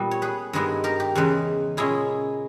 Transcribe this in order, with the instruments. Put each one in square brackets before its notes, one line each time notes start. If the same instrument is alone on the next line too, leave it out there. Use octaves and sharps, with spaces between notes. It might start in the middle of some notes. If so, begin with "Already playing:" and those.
Already playing: [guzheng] A#2 G3 B3
C#5
G#4 B4
G2 D#3 G#3 B3 E4
G4 A#4
G4
E2 C#3 E3 G#3
A#2 G#3 C#4 E4 G#4